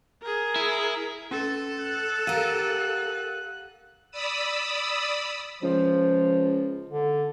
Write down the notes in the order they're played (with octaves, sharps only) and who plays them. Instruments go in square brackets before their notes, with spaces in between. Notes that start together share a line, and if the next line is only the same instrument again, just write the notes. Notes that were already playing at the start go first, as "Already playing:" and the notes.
[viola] G#4 A#4
[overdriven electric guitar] E4
[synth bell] C#4 [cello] A4
[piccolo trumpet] F#6
[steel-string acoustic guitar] G4 A#4 [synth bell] F5 F#5 D#7
[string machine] D5 B5 D#6 E6
[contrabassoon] C#2 [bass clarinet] F3
[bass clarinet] D3